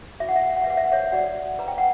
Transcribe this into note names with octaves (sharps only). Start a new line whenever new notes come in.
F#4 E5
F#5
E5
F#5
E5
F#5
E5
B4 F#5
E5
F#5
C#5 E5
F#4 D5 F#5
B4 A#5
G5
F#5